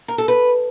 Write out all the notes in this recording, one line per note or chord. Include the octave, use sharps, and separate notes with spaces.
A#4
A4
B4